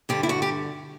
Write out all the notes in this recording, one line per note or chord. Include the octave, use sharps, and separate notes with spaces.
G2 D3 G4
E4
F#4
G4